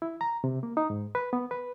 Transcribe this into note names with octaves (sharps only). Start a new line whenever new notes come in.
E4
A#5
C3
A#3
D#4
G#2
B4
B3
B4